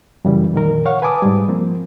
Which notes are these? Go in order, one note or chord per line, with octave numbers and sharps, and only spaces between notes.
F#2 C#3 E3 G3
F2 A#2 D#3 A#4
C#5 F5 F#5 C#6
B4 G#5 A5 D6 D#6
G#2 G3
F3 A#3 C4